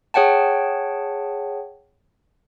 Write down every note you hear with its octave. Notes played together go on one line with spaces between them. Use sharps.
G#4 C#5 F#5 G5 A5